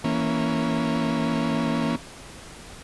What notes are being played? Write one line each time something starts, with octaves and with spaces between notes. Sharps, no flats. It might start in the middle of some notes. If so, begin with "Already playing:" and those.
E3 A#3 C#4